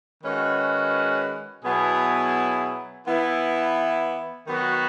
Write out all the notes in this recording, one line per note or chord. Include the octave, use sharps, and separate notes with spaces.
D#3 G#3 C#4 F#4 B4
B2 F#3 B3 E4 G#4
E3 B3 E4
D#3 F#3 B3 F#4